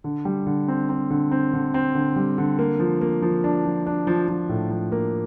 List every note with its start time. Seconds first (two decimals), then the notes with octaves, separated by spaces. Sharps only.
0.04 D3
0.25 G3
0.46 D3
0.68 C4
0.89 C4
1.10 D3
1.31 C4
1.53 D3
1.74 C4
1.95 D3
2.16 G3
2.38 D3
2.59 A#3
2.79 F3
3.01 A#3
3.22 F3
3.44 D4
3.65 F3
3.86 D4
4.07 F3
4.28 F3
4.49 A2
4.71 F3
4.92 A#3